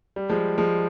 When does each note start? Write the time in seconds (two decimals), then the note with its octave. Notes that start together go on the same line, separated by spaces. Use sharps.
0.16 G3
0.30 F3 G#3
0.58 F3 G#3